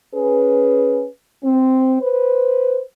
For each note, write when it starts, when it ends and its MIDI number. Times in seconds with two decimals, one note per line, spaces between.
0.14 1.06 61
0.14 1.06 68
0.14 1.06 71
1.44 1.98 60
2.00 2.81 71
2.00 2.81 72